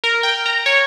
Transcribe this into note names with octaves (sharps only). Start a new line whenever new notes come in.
A#4
G5
A#5
C#5